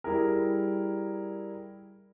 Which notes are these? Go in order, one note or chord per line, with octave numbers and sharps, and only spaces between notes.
G3 E4 G#4 A#4